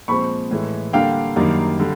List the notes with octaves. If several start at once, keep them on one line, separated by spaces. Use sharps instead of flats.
A#2 F3 G#3 C4 B5 C#6
A2 E3 G#3
D3 G3 A#3 D4 F5 G5
F#2 D#3 G3 A#3 D4
D3 G3